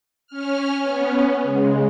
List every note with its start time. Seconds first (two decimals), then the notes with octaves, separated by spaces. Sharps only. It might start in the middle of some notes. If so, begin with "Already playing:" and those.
0.27 C#4 F6
0.82 B3 C#4
1.42 C#3 G#3